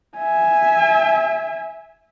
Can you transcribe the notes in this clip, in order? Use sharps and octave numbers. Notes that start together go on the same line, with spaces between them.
E5 G#5